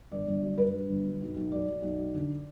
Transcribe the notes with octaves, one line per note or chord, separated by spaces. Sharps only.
G1 D5
G1
F#3
G2 B4
G2
G1
F#3
B1
B1
F#3 D5
B1
B1
F#3
D3